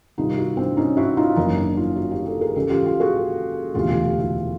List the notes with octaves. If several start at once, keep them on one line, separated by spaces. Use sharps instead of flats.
C2 C3 D#3 D#4 F4
E4 F#4
C4 D4
C#4 D#4
E4 F#4
D#4 F4
F#1 F#2 D#3 C#4 D#4
D4 E4
D#4 F4
E4 F#4
F4 G4
G4 A4
G#4 A#4
C#2 C#3 E3 G4 A4
F4 G4
F4 G4
F#4 G#4
E1 D2 C3 E3 F4 G4
F4 G4
F4 G4
E4 F#4